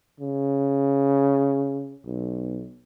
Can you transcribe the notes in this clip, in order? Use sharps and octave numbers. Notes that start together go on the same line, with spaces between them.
C#3
B1